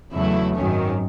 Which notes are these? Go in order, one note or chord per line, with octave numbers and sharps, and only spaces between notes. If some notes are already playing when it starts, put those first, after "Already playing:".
E2 C#3 F#3 A3 E4
G#1 F#2 D#3 F#3 C#4